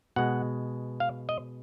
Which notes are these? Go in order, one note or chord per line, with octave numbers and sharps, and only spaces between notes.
B2 G#3 F#5
F5
D#5